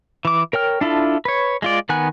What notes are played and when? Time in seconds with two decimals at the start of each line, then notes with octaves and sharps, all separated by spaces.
0.25 E3 D6
0.53 A#4 C#5 G5 F6
0.81 D4 E4 F4 A4
1.25 B4 C#5
1.62 G#3 F4 D5
1.89 D#3 B3 F#5 G#5 F#6